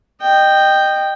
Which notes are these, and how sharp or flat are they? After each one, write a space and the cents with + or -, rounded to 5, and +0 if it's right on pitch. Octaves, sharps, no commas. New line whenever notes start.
D#5 -20 G5 +0